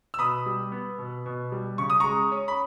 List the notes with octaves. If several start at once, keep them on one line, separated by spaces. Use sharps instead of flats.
E6
B2 B5 D#6
G3
B3
B2
B2
G3
C#3 C#6
D#6
G#3 A#5 C#6
C#4
B5